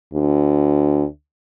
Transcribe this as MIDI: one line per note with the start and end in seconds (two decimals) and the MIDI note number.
0.13 1.04 38